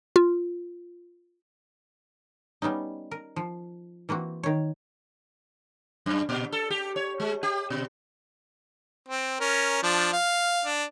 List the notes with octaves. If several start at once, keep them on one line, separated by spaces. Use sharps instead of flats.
F4
G3 B3 C#4 D#4
A#4
F3
E3 A#3 C4 F#4
D#3 C#5
F#2
A#2
A4
G4
C#5
G#3
G4
B2
C4
C#4 A#4
F3 D4
F5
D4